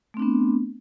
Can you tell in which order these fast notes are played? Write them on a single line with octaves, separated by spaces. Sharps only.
A3 C4 D4 B3